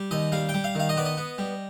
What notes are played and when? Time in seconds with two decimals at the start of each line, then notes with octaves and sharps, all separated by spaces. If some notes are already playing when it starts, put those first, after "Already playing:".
Already playing: G3
0.11 D#2 D#5
0.32 G3 F5
0.49 G5
0.54 G3
0.64 F5
0.75 D#3 F5
0.89 D#5
0.97 B3 D5
1.05 D#5
1.17 B3
1.38 G3